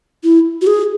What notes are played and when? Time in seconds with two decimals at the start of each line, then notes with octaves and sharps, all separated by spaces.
0.24 E4
0.61 F#4
0.67 G#4